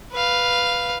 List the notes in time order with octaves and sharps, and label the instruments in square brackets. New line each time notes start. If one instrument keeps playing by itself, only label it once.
[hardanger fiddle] B4 F5